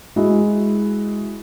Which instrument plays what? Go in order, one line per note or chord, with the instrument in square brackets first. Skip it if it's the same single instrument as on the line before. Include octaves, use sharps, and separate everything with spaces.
[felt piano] G#3 E4 F#4